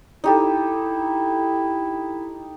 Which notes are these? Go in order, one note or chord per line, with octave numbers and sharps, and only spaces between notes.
D#4 E4 G4 A4